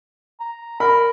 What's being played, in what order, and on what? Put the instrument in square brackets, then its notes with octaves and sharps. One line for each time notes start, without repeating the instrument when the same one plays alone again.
[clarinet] A#5
[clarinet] A#4 [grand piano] B5